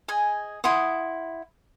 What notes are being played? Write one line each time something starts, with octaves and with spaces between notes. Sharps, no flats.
G#4 D#5 G#5
E4 F#5 C6 D#6